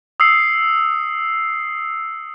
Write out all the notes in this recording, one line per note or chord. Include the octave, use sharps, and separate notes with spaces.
D#6 E6 C7 C#7